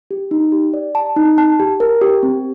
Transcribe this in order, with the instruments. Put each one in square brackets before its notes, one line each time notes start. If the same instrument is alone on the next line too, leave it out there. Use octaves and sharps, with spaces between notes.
[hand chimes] G4
D#4
G4
D5
A5
D#4
A5
G4
A#4
G4
C4